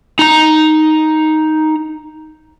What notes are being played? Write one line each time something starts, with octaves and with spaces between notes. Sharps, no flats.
D#4 A#5